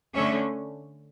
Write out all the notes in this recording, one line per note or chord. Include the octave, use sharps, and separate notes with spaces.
D3 A3 C#4 C#5 E5